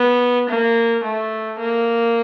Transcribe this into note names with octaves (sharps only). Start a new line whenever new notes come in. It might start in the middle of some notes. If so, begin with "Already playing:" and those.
Already playing: B3
A#3
A3
A#3